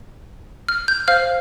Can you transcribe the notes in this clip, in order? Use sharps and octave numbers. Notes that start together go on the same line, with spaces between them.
F6
G6
C5 F5 F6